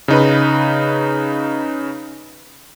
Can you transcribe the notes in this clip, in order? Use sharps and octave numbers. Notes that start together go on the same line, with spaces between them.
C#3 D#4 B4